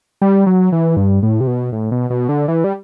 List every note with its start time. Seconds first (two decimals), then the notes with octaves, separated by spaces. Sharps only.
0.22 G3
0.47 F#3
0.72 E3
0.97 G2
1.23 A2
1.40 C3
1.47 B2
1.72 A2
1.91 B2
2.10 B2
2.29 D3
2.48 E3
2.64 G3